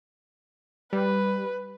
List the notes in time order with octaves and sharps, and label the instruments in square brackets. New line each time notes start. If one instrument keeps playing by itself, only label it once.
[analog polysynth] G3 [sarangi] B4